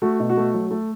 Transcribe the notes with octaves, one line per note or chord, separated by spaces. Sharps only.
A3 F#4
B2
F#4
A3
F#3
A3